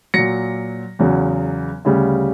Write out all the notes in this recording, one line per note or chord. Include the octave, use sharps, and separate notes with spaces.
A#2 F#3 A#6 C#7
E2 C#3 F#3
D2 C#3 G3